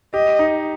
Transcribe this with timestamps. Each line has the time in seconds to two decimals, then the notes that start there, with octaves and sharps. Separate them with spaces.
0.14 G4 D#5
0.39 D#4